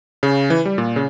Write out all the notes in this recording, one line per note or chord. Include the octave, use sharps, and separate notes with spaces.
C#3
E3
G3
A#2
C#3